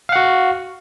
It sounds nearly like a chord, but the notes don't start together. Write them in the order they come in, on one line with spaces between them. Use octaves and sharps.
F5 F#5 F#4